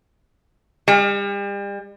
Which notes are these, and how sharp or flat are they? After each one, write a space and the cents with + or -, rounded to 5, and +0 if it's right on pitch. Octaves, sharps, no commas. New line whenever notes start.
G3 +40